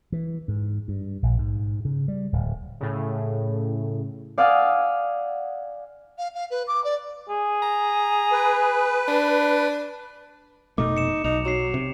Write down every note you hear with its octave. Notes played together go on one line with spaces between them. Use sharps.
E3
G#2
G2
A#1
G#2
C#3
G3
D1
A2 C#3
D5 F5 F#5 G#5 D#6 E6
F5
F5
B4
D6
D5
G#4
A#5
B4
D4
F1 B2 A3 D#4 D6
C#7 E7
B1 D#4 F7
F#3 C7 E7
C3